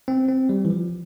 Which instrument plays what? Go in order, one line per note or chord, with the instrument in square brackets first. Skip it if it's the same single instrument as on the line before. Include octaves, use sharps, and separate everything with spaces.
[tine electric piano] C4
C4
G3
E3
F3